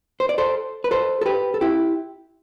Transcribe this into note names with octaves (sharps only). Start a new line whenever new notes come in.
C5
D5
A4 C5
B4
A4 C5
A4
G4 B4
A4
E4 G4